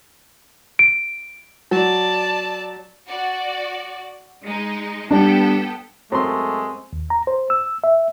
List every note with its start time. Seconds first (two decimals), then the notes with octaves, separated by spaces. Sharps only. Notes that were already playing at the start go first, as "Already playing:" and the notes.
0.79 D7
1.71 F#3 D5 A5
3.08 F#4 D5
4.43 G#3 D#4
5.11 G3 B3 D4 A4 G5
6.12 F#2 G#3 A3 C4 C6
6.93 D#2
7.10 A#5
7.27 C5
7.50 E6
7.84 E5